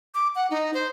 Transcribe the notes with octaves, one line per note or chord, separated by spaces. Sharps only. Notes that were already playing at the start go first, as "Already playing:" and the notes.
D6
F#5
D#4
C5